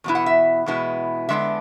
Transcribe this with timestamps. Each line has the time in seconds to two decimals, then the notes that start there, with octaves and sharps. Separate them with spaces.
0.04 E2 B2 B3 E4
0.15 F#5
0.26 E5
0.66 E2 B2 G#3 B3 E4
1.29 D3 G#3 B3 D4 E5